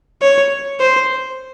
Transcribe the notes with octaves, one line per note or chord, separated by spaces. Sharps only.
C#5
C5